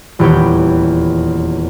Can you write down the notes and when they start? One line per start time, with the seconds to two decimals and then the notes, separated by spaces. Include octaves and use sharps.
0.19 D#1 E2 G4 B4 C#5 G5